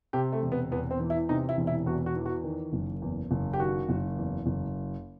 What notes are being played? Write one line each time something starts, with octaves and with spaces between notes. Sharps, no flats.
C3 G4
A3
E1
B3
E2 B3
C4
E3
E4
C3 D#4
E4
E1
E4
E2 F#4
F#4
E3
F#4
D#3
F#1
E2
F#1
G4
D#3 F#4
F#1
E2
F#1